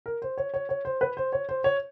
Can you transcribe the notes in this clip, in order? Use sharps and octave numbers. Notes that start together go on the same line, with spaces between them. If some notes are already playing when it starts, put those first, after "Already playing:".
A#4
C5
C#5
C#5
C#5
C5
B4
C5
C#5
C5
C#5